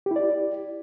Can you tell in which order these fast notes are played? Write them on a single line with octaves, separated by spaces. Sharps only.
G4 E4 D5